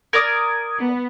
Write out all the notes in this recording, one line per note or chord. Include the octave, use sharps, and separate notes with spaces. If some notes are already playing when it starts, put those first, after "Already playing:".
A#4 D5 D6 D#6 G#6
B3